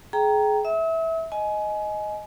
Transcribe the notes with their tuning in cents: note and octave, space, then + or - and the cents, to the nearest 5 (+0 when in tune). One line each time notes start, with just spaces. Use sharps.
G#4 +30 G5 +0 A#5 +0
E5 -15 E6 -45
D#5 +0 G#5 +25